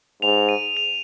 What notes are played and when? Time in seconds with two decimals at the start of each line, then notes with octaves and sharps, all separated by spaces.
0.22 G#2 F7
0.49 D#7
0.77 F7